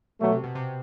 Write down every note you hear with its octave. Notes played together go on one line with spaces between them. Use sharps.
B2 F#3 A3
C3
B2
C3